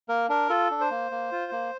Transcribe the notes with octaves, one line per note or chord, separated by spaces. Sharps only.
A#3 A#4
D4 A#4
F4 A4
D4
C5
A#3
A#3
F4
A#3